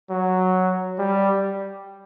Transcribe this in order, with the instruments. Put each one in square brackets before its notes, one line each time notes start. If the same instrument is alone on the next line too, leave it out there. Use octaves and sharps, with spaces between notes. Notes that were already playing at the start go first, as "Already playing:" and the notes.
[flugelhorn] F#3
G3